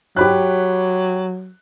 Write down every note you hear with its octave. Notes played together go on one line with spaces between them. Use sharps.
F#3 G4 B5 F#6